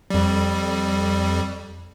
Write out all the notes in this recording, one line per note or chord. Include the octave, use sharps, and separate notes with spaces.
F2 G3